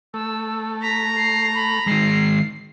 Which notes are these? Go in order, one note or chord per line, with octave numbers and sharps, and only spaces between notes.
A3 E6
A#5 B6
C7
B5
D#3 G#3 C7